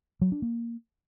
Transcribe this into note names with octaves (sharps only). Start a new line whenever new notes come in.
F#3
D4
A#3